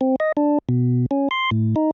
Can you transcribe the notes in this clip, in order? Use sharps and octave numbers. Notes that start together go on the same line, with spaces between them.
C4
D#5
D4
B2
C#4
C6
A2
D#4